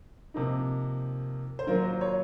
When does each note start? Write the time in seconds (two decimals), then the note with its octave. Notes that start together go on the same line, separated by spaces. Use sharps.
0.34 C3 F3 A#3 D#4
1.59 C5
1.67 D#3 F#3 A#3 F4 A#4
1.83 C5
2.01 C#5